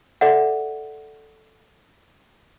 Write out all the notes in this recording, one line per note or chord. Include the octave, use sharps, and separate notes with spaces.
A4 D5 E5 F#5